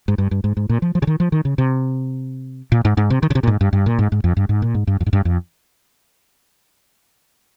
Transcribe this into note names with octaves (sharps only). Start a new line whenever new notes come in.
G#2
G2
G2
G#2
G#2
A#2
F3
F3
C#3
D#3
F3
D#3
C#3
C3
A#2
G#2
G#2
C3
D#3
C#3
C3
A#2
G#2
G2
G2
A#2
G#2
G#2
F2
G2
G#2
A#2
G#2
G2
F2
G#2
G2
F2